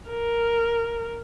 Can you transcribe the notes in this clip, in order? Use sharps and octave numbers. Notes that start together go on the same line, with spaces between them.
A#4